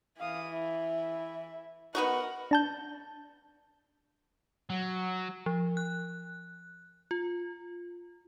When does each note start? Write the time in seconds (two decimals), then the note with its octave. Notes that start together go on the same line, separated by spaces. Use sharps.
0.20 E3 F5 D#6
0.50 E4 E5
1.95 B3 D#4 F#4 A#4 F#5
2.51 D4 A5 G6
4.70 F#3
5.46 F3
5.77 F#6
7.11 F4